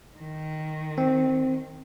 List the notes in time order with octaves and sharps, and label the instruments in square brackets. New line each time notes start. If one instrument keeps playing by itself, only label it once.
[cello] D#3
[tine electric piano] C4